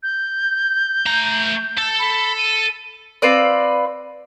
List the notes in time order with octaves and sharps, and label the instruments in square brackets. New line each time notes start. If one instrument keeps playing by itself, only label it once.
[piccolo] G6
[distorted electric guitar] A3 A#5
A4
[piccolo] B5
D#7
[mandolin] C4 F4 B4 D5